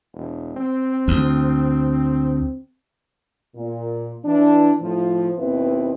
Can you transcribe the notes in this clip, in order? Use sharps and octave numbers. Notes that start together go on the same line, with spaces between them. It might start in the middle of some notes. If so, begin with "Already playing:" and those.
E1
C4
D2
A#2
E3 D4
A2 F3
D#2 B2 C4 E4 B4